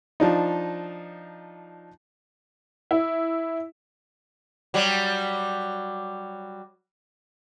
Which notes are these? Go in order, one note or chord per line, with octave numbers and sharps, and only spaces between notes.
F3 D4 D#4
E4
F#3 G3